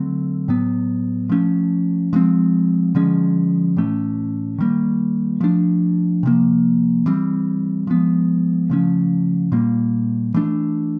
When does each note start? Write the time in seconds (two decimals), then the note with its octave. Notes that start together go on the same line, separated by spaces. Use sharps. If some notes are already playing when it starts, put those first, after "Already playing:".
Already playing: D3 F#3 A3 C4
0.48 A2 F#3 B3
1.29 F3 A3 C#4
2.13 F3 G#3 C4
2.95 D3 F3 G#3 C#4
3.77 A2 E3 A3 C#4
4.58 D#3 G3 A#3
5.41 F3 A3 D4
6.23 C3 F3 A#3
7.06 E3 G3 C4
7.87 F3 G#3 B3
8.70 C#3 F3 A3 C#4
9.52 A#2 G3 A#3
10.34 E3 A3 D4